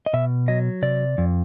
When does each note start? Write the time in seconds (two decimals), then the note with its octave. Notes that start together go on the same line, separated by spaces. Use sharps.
0.06 D#5
0.13 B2 E5
0.48 F#3 D#5
0.82 C3 D5
1.18 F2